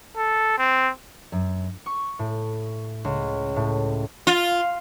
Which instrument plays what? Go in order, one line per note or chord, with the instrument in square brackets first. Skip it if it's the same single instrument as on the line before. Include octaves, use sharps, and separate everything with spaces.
[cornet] A4
C4
[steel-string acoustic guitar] F#2
[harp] C#6
A2
C#2
A2
[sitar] F4